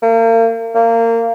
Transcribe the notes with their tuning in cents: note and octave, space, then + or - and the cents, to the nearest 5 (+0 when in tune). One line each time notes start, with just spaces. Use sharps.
A#3 -40
A#3 -25